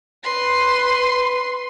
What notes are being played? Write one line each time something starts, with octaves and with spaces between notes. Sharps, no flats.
B4 C6